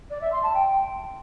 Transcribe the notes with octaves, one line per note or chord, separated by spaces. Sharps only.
D5
E5
C6
A5
G5